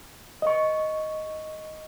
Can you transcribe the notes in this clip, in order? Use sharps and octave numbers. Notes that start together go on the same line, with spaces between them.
D#5 C#6